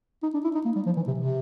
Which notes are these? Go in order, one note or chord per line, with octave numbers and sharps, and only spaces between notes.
D#4
D4
E4
D#4
A#3
G3
F3
E3
C3
C3